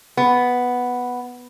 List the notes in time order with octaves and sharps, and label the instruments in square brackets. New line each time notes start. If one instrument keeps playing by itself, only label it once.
[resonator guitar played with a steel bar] B3